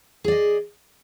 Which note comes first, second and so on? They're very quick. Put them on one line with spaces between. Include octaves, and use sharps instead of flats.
G#4 D5 D#5